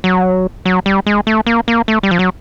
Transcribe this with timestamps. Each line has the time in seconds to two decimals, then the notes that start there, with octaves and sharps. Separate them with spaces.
0.04 F#3
0.65 F#3
0.86 G3
1.06 G#3
1.27 A3
1.46 A#3
1.68 A#3
1.88 A3
2.03 G3
2.11 F3
2.19 F#3